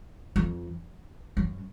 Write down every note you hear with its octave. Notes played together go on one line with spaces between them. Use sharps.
F2
F#2